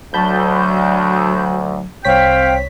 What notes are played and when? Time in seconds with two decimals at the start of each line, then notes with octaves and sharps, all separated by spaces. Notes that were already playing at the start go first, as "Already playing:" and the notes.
0.14 D2 F#3 A5 B5 G6
2.05 C2 C4 C#5 F5 G5 B6